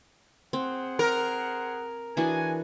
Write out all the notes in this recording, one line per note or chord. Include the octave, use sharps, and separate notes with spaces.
C4 G#4 C5 F#5
A#4
E3 D4 F#4 G#4 G#5